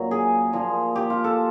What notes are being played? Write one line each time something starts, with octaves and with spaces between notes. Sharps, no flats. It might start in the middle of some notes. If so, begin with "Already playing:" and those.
Already playing: F#2 A#2 F#3
G#4
A#2 F3
G4
F4
A4